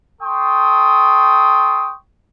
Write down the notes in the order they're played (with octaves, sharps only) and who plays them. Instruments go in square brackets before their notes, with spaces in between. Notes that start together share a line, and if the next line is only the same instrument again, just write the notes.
[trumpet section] A4 G5 C6 C#6 D#6